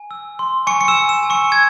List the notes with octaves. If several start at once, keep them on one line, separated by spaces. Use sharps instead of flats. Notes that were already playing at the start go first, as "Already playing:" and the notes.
Already playing: G#5
E6
C6
G#5 C#6 C#7
C#7
E6 E7
G#5
E6 E7
G#5
C#6 C#7
E6 G#6